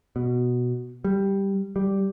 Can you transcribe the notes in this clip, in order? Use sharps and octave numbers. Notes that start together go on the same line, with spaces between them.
B2
G3
G3